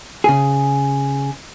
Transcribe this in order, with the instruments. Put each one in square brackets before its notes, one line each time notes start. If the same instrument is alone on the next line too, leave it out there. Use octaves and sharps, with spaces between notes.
[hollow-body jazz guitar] C#3 G#4